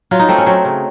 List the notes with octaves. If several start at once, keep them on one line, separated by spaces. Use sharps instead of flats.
F#3 F4
D#4
A3 C4
C#4
F#3 C4
C#3